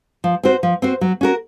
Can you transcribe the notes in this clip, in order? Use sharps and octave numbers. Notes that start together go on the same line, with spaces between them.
F3
C4 F#4 C5
F3
C4 F#4 C5
F#3
C#4 F#4 A#4